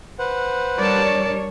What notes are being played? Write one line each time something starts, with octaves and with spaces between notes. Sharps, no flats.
B4 C5 F#5
G3 D4 A#4 C#5 D5 A5